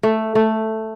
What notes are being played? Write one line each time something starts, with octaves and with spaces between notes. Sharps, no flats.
A3
A3